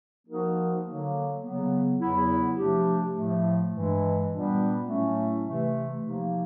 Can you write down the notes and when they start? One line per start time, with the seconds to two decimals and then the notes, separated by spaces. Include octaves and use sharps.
0.27 F3 A#3 D#4 F#4 A#4
0.83 D3 F#3 A#3
1.41 C#3 F#3 B3
1.98 E2 C#3 F#3 B3 E4
2.56 C3 F3 A3 D4 G4
3.13 A2 F3 A3
3.70 G2 E3 G#3
4.28 A#2 G3 B3 D4
4.86 A2 F#3 A3 C#4
5.43 C3 E3 A3
6.00 C3 F3 A#3 D#4